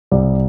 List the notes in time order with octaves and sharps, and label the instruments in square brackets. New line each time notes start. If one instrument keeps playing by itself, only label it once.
[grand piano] C2 D5